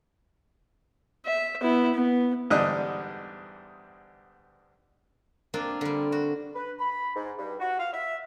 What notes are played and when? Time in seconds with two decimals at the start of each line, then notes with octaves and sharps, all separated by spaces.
1.26 E5
1.61 B3 E4
1.94 B3
2.50 E2 G#2 D3 G3 D#5 F#6
5.54 A#3 C4 D4 F4
5.81 D3 G3
6.12 F#4
6.55 B4
6.79 B5
7.15 G#2
7.39 G2
7.60 F#4
7.79 F5
7.93 E5